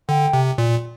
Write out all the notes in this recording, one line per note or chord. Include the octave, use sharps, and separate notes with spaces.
D3 G5
C3
A#2